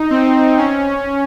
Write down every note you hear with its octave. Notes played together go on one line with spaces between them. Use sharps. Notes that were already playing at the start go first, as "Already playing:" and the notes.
Already playing: D#4
C4
C#4